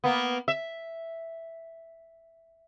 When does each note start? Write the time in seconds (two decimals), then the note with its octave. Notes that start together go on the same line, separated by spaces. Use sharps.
0.04 A#3 B3
0.48 E5